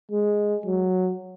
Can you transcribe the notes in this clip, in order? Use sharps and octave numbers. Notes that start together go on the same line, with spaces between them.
G#3
F#3